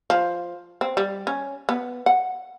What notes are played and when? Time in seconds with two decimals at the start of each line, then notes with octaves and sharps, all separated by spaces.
0.10 F3
0.81 C4
0.97 G3
1.27 C#4
1.69 B3
2.06 F#5